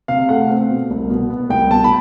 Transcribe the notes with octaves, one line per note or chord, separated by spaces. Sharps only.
C3 F5
A3 F#5
C4
B2
C2
B2
B3
C2 G5
B2 A5
B5